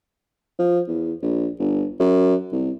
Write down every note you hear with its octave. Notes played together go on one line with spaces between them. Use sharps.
F3
E2
A#1
G1
F#2
C2